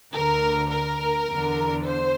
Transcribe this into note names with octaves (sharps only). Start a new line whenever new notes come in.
D2 D3 A#4
A#4
E2 D3
C5